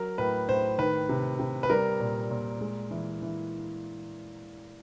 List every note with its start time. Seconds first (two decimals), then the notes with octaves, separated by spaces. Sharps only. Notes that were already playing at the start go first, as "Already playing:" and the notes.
Already playing: F#3 A#4
0.18 A2 B4
0.49 A2 C5
0.78 D#3 B4
1.09 C3
1.39 C3
1.63 B4
1.70 G3 A#4
2.00 A#2
2.31 A#2
2.61 G#3
2.91 E3
3.22 E3